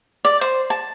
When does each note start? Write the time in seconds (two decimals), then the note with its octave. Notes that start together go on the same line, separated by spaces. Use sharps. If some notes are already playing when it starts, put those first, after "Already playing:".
0.25 D5
0.41 C5
0.70 A5